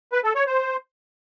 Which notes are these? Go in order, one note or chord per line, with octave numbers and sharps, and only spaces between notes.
B4
A4
C#5
C5